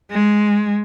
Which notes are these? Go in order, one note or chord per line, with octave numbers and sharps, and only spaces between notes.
G#3